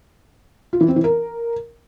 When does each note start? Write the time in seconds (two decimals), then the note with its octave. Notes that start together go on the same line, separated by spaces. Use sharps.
0.73 F4
0.81 E3
0.88 C4
0.96 E3
1.04 A#4